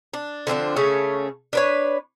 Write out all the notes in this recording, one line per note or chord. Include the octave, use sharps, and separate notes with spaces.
D4
D3 F3 C4 D4
C#3 A3 C#4 C#5
D4 B4 C#5